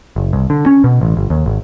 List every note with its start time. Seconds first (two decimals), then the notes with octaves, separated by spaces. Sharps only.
0.16 F#1
0.33 C2
0.50 D3
0.66 C#4
0.84 B2
1.01 A1
1.17 G1
1.30 D#2
1.46 G#1